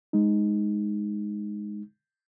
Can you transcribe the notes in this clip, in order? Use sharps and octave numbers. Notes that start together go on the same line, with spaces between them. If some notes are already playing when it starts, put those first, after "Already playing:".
G#3 D#4